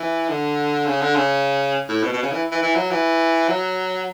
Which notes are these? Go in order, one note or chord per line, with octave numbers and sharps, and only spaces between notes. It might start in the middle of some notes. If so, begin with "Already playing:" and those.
Already playing: E3
D3
C#3
D3
C#3
A2
B2
B2
C#3
E3
E3
E3
F#3
E3
F#3